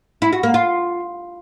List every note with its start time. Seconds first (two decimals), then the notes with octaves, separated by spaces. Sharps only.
0.22 E4
0.33 F#4
0.43 A#3
0.54 F4